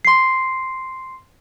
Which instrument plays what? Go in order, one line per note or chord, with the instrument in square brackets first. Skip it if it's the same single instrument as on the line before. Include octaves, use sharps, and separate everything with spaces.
[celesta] C6 C7